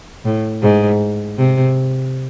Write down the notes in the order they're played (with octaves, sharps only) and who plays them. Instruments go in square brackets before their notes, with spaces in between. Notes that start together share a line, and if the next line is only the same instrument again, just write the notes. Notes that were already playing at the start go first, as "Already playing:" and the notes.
[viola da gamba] A2
G#2
C3